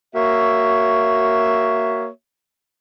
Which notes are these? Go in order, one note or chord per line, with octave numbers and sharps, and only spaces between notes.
A#3 F#4 C#5 E5